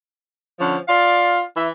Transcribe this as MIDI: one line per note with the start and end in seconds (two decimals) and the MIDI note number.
0.60 0.77 50
0.60 0.77 53
0.60 0.77 61
0.88 1.43 65
0.88 1.43 74
0.88 1.43 77
1.57 1.68 52
1.57 1.68 76